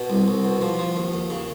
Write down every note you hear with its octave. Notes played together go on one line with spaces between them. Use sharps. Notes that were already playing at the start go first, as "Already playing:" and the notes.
Already playing: B2
C2
C2
B2
F3
F3
D#2
D#2
C#3